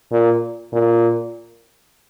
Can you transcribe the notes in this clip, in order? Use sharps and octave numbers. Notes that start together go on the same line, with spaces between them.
A#2
A#2